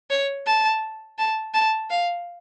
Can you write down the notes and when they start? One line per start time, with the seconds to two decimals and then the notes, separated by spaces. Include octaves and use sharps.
0.10 C#5
0.46 A5
1.18 A5
1.54 A5
1.90 F5